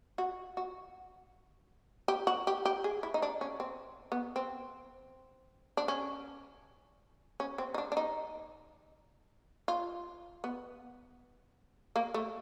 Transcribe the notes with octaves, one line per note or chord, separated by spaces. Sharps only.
F#4
F#4
G4
F#4
G4
G4
G#4
E4
D#4
D4
C#4
C4
B3
C4
D4
C#4
C#4
C4
D#4
D4
D4
D#4
F4
B3
A#3
A3